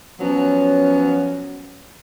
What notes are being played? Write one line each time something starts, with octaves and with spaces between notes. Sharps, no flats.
F3 F#3 B3 C#4